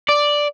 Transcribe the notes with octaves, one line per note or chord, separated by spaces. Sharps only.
D5